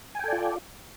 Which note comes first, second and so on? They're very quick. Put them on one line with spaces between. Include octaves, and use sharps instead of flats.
G#5 G5 A4 D5 F4